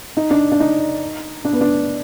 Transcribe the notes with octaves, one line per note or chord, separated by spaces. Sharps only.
D#4
D4
D4
D#4
D4
B3
D4